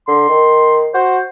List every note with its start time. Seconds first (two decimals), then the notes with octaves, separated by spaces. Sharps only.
0.08 D3 C6
0.29 D#3
0.94 F#4 C5